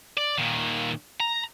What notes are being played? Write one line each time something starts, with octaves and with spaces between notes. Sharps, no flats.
D5
A#2 D#3
A#5